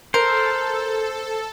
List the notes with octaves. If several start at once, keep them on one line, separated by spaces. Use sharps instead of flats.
A4 A#4 C5